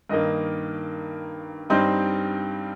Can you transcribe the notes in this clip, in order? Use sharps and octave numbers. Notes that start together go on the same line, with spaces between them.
G2 D#3 A#3 D#5
G2 G3 C4 D#4 C5